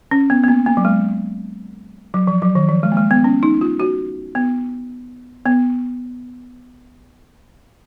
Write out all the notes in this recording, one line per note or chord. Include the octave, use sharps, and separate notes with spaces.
C#4
B3
B3
A#3
A#3
F#3
G#3
F#3
F3
F#3
D#3
F3
G#3
A#3
G#3
B3
C#4
D#4
F4
F#4
B3
B3